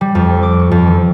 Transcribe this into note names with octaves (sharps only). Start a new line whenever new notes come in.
G3
F2
D6
C#6
F2
E3